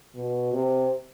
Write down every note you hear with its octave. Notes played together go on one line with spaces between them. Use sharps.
B2
C3